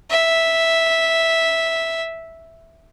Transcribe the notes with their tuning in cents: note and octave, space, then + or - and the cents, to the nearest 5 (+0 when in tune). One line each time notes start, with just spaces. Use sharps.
E5 -5